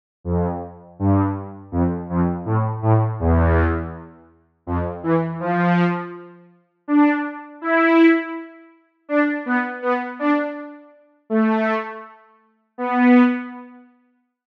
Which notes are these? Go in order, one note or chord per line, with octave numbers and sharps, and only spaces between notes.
F2
G2
F2
F2
A2
A2
E2
F2
E3
F3
D4
E4
D4
B3
B3
D4
A3
B3